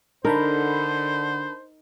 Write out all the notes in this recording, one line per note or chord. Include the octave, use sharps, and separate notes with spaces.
D3 D4 D#4 A#4 C5 A5 B5